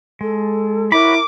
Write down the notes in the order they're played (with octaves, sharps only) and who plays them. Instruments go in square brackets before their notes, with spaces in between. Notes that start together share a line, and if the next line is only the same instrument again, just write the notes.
[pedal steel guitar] G#3 [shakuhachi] A4
[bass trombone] E4 [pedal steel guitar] F#4 C#5 B5 [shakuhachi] A#4 [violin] D6